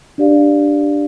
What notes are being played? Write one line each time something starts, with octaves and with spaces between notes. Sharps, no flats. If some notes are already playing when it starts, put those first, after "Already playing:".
D4 G4 D5 F5